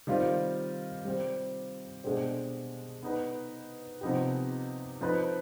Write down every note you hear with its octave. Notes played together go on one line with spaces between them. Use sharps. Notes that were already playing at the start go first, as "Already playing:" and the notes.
D#3 G3 C4 F4
G3 C4 G4
B2 G#3 D4 G4 C5
B3 D#4 B4
C3 F3 B3 D#4 G4
F3 C4 D#4 B4